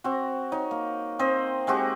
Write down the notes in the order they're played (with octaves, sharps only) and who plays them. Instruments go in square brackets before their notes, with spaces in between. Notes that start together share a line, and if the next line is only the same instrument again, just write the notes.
[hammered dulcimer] C4 F#4
D#4 C#5
A#3
C4 C5 D#5
G#3 C4 F#4 G4